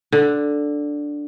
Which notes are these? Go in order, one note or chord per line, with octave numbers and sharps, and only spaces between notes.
D3